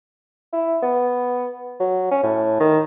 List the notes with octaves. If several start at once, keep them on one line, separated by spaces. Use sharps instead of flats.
E4
B3
F#3
C#4
A2
D#3